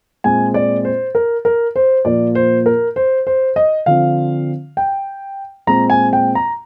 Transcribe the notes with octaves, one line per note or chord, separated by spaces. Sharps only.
A#2 G#3 C4 G#5
D5
C5
A#4
A#4
C5
A#2 F3 A#3 D5
C5
A#4
C5
C5
D#5
D3 F3 C4 F5
G5
A#2 G#3 C4 A#5
G#5
G5
A#5